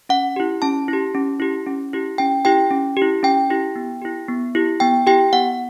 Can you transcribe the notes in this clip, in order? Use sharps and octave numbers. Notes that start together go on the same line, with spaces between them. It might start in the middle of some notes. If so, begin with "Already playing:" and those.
C#4 F#5
E4 G4
C#4 A5
E4 G4
C#4
E4 G4
C#4
E4 G4
C#4 G5
E4 G4 G5
C#4
E4 G4
C#4 G5
E4 G4
B3
E4 G4
B3
E4 G4
B3 G5
E4 G4 G5
B3 F#5